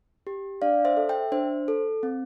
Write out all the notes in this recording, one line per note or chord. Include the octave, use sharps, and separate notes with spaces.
G4
D4 D5 F5
C5 E5
A4
E5 G5
D4 C5
A4
C4